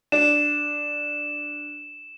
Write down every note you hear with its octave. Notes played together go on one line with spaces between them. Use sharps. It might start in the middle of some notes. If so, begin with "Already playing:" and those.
D4 E7